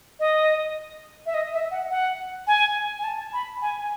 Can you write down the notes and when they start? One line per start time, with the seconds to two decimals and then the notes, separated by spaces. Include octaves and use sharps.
0.20 D#5
1.26 E5
1.34 D#5
1.53 E5
1.71 F#5
1.90 F#5
2.47 G#5
2.99 G#5
3.04 A5
3.33 B5
3.62 G#5
3.81 G#5